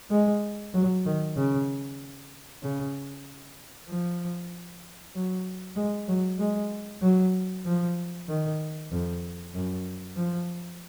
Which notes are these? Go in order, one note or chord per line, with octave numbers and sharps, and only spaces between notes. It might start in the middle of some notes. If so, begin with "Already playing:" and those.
G#3
F#3
D#3
C#3
C#3
F3
F#3
G#3
F#3
G#3
F#3
F3
D#3
F2
F#2
F3